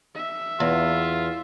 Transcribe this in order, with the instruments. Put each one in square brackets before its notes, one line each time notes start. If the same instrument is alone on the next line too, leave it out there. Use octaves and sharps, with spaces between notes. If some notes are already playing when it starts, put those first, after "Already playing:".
[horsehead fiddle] E5
[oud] E2 [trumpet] F4